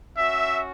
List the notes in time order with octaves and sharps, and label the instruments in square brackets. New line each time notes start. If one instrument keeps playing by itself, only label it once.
[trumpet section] C#4 F#4 E5